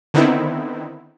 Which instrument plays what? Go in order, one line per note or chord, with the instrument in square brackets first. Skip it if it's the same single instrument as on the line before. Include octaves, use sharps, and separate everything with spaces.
[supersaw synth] D3 D#3 B3 C4 D#4 E4